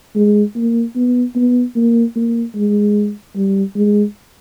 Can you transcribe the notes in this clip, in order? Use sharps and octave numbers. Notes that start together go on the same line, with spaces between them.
G#3
A#3
B3
B3
A#3
A#3
G#3
G3
G#3